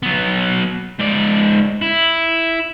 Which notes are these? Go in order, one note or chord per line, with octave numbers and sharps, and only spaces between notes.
F#3 B3
G#2 D5
E4